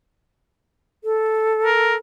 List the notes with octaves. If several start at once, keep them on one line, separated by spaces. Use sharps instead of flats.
A4
A#4